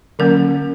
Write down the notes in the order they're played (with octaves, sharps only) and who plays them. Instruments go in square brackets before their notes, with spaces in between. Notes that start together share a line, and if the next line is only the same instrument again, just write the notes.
[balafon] D3 F#3 A#3 C#4 A#4